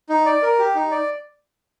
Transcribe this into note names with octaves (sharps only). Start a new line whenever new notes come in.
D#4
D5
A#4
G4
D#4
D5